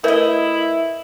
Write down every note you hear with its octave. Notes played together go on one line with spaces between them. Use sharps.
A3 E4 A#4 B4 C#5 D#5